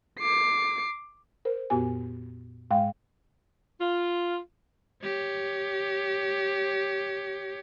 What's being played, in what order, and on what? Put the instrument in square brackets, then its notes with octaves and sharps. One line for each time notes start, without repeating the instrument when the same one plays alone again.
[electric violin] D6 C7
[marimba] A#4 C5
F2 A#2 B3 F#4 G4 G#5
G#2 G#3 F5 G5
[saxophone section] F4
[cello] G4 C#5